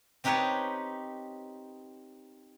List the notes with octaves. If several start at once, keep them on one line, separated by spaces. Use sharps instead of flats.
C4 D#4 G4 B4 C#5 A5